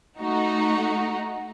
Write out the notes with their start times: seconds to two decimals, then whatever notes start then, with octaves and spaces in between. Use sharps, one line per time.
0.21 A3 D#4 F#4